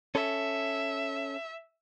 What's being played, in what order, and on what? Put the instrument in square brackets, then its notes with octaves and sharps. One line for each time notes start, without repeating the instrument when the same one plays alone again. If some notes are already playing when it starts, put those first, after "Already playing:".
[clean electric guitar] C#4 A4 [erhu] E5